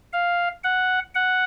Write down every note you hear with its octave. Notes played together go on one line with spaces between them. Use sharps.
F5
F#5
F#5